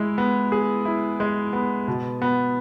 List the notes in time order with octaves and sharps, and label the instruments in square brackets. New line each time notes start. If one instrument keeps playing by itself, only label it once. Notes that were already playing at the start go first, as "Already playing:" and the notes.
Already playing: [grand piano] G#3 E4
B3
G#4
E4
G#3
B3
B2
B3